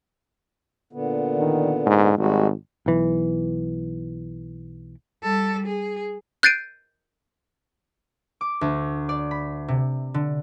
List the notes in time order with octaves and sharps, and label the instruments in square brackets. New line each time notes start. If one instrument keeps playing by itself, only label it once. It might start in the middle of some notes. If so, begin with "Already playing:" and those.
[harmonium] A#2 D3 B3
[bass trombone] D#3
G#2
[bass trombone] G#1 [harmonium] G3 G#3 F#4
[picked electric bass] B1 E3
[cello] G3 A4
G#4
[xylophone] F#6 G6 A6 C7 D7 D#7
[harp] D6
D2
D5
B5
C3
D3